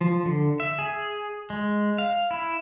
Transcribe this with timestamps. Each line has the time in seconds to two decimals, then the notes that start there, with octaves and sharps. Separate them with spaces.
0.01 F3
0.26 D3
0.60 E5
0.79 G#4
1.50 G#3
1.98 F5
2.31 E4